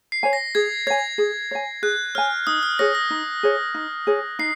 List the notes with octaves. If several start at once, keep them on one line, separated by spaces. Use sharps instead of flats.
C7
C#5 G#5
A#6
G#4 G#6
C#5 G#5 G#6
G#4
C#5 G#5
G#4 F#6
C#5 G#5 F6
D#4 D#6
F6
G#4 C#5 A#6
A#6
D#4
G#4 C#5
D#4
G#4 C#5
D#4 C7